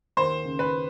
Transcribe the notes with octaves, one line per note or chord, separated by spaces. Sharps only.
D#2 C5
C#3
B4